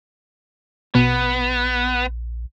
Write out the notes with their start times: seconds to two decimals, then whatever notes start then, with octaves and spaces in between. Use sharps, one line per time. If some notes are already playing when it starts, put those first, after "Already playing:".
0.95 A#1 B2 B3